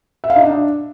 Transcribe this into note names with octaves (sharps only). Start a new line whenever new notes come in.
E5
F5
D#4
D4